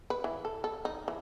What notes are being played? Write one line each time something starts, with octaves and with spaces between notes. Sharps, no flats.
B4
E3
A4
A4
D#4
E3